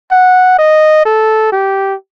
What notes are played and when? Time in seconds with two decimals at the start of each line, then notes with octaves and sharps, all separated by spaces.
0.12 F#5
0.59 D#5
1.06 A4
1.52 G4